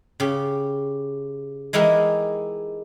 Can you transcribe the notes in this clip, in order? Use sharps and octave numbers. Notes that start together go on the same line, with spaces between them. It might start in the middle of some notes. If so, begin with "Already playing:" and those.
C#3 G4
E3 G#3 D#4 E4 G4 A#4